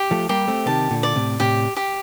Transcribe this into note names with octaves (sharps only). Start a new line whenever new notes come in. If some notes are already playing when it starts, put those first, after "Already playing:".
Already playing: G4
F3 A3
G3 A#3 G4
A3 C4
C3 D#3 A5
A#2 D3
D5
A2 C3
A2 C3 G4
G4